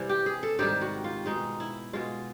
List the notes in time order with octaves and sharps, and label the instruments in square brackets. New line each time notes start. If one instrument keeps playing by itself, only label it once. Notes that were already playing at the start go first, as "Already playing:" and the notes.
Already playing: [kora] C3 E3 G3
G4
G#4
A4
G#2 D#3 G3 G4
F#4
F4
B2 G#3 D#4
E4
B2 G#3 F4